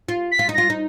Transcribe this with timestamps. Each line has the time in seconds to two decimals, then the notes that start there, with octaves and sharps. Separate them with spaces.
0.09 F4
0.32 B6
0.39 F4
0.49 D#4
0.54 F4 A#6
0.70 D#4